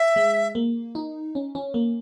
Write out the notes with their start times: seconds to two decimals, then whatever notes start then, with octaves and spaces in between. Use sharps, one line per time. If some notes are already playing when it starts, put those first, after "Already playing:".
Already playing: E5
0.16 G#3
0.55 A#3
0.95 D#4
1.35 C#4
1.55 C#4
1.74 A#3